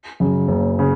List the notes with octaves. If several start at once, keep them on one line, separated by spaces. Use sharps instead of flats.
F#2 C#3
F#1
C#3